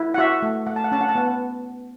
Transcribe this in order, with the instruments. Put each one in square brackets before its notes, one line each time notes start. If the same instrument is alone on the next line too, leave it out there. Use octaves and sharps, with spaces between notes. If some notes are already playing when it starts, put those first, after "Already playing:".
Already playing: [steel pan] E4
F#5
F#4 E5
A3
A3 F#5
A5
F#5
C#4 A5
F#5
A5
B3 F#5